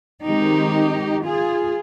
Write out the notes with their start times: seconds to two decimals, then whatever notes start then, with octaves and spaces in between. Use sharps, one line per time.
0.24 D#3 G#3 C4 D#4 G4
1.25 F4 G#4